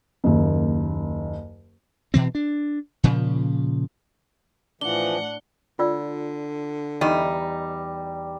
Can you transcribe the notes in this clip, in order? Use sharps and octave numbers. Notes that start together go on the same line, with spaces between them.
F#1 D#2
B2 E3 C4
D4
A#2 C#3 F3
A2 E3 F3 D4 F#5 G7
D3 F4 D5 E6
E2 G3 D#4 D#5